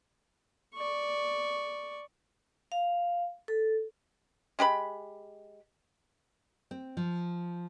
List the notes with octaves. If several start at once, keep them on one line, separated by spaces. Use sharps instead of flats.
D5 C#6
F5
A4
G#3 G4 A#4 B5
C4
F3